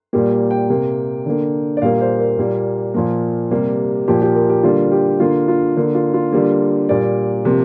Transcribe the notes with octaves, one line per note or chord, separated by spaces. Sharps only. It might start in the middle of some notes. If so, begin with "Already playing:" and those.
A#2 G3 A#3 G4
G5
C3 A#3
D3 A#3
D5
A#2 G3 A#3 F5
C5
A#4
A#2 G3 A#3
A#2 F3 A#3 A#4
C3 G3 A#3
A#2 F3 A#3 G4
G4
A#4
G4
D3 G3 A#3 F4
G4
D3 A#3 F4
F4
D3 A#3
F4
F4
D3 G3 A#3
A#2 G3 A#3 D5
C3 F3 A#3